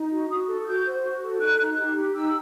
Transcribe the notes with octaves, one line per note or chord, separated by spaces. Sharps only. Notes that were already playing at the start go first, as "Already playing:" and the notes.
Already playing: D#4
F#4
F#4 D#6
A4
F#4 G6
C5
F#4
A4
D#4 F#6
D#4
G4
G4
D#4 E6